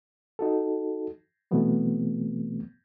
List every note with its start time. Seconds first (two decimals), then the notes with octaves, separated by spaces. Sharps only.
0.39 D#4 F#4 A4
1.51 B2 E3 F#3 A3 B3 C4